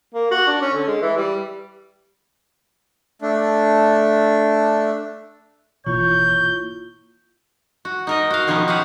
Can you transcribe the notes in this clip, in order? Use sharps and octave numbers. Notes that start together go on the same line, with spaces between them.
A#3
F#4
D4
C#4
D3
G#3
E3
G3
A3 D4
G#1 B2 E3 A#3 E4 F4 C#5 G6
F#4
D#4 A#4 D#5
F#4 F5
B2 D#3 F3 B3 C#4 D#4
F#4 G4 B4 F5 F#5